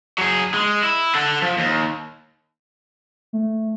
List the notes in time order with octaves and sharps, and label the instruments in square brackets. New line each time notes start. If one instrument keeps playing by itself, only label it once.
[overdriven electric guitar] F#3 G#4
G#3
E4
A4 F#5
F3
D#2
[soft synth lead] A3